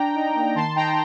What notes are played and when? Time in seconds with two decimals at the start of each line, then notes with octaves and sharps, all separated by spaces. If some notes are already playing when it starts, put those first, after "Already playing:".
Already playing: D4 G5 A#5
0.14 D#4
0.35 A#3
0.55 D#3 A5 C6
0.76 D#4 G5 A#5